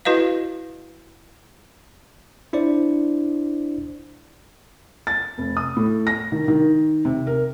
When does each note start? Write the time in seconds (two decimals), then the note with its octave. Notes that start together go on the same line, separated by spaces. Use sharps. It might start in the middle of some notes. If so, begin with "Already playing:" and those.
0.05 E4 F#4 B4 D#5 F5
2.53 D4 E4 C5 D5
5.07 A6
5.38 F1
5.57 D#6
5.77 A2
6.07 A#6
6.32 D#3
6.48 D#3
7.05 C3
7.27 A#4